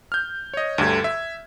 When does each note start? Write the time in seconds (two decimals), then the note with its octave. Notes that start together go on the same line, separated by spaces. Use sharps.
0.12 F6 G6
0.54 C#5 D#5
0.78 D2 G2 D3 G4 G#6
1.04 E5